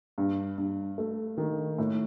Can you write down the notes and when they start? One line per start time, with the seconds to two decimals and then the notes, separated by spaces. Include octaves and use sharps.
0.18 G2
0.58 G2
0.98 A3
1.37 D#3
1.78 A2